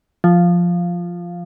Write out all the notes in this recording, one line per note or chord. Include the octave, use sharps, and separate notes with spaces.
F3